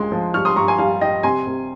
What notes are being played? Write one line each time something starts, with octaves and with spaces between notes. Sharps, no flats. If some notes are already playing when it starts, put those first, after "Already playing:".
Already playing: C#2 G#3 C6
F3
G3 C#6 F6
C6 D#6
G2 A#5 C#6
G#5 C6
G3 F5 G#5
G3 D#5 G5
C3 G#5 C6
C3